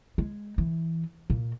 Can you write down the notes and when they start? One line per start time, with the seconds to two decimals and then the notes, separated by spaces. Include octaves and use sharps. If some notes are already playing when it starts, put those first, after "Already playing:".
0.18 G#3
0.58 E3
1.30 A#2